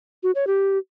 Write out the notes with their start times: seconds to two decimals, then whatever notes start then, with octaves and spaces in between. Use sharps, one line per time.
0.23 F#4
0.35 C#5
0.47 G4